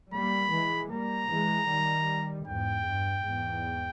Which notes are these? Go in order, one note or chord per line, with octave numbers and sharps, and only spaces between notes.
G3 A#3 B5
E3 G#3
G3 A#3 A#5
E3 G#3
D#3 G3
E2 G#2 G5
G2
E2 G#2